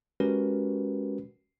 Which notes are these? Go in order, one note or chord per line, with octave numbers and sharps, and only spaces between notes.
G#3 C#4 F#4 G4 A#4 B4